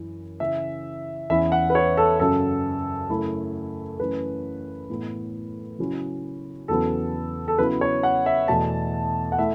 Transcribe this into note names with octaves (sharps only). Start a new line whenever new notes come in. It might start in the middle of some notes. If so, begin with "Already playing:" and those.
Already playing: F#2 E3 C#4 E4
C#3 E3 C#4 E5
E2 E3 C#4 E4 E5
F#5
B4
C#5
A4
F#2 C#3 F#3 A4
F#2 C#3 A3 E4
F#2 E3 A3 C#4 B4
A2 E3 B3 E4
C#3 F#3 C#4 E4
E2 C#3 F#3 B3 E4 A4
A4
C#3 F#3 B3 E4 B4
C#5
F#5
E5
E2 B2 A3 A5
F#5
A3 E4 E5